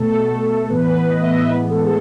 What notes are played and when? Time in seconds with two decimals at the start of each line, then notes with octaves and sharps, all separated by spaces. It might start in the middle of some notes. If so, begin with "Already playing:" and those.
Already playing: B2 A3 A4
0.30 B2 A3
0.69 A2 E3 B3 B4
1.09 A2 E3 B3 D#5
1.22 E5
1.30 D#5
1.50 A2 E3 G#3 B3 B4
1.70 A4
1.84 G#4